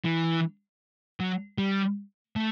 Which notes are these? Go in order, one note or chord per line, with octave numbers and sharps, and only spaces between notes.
E3
F#3
G3
A3